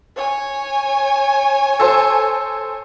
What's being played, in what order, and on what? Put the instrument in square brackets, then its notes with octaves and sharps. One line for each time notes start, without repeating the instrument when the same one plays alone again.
[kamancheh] C#5 G#5
[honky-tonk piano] A4 C5